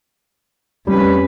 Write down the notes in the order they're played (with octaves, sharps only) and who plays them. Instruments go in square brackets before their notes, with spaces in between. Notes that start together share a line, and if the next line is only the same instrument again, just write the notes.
[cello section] F2 C#4 B4 [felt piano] G3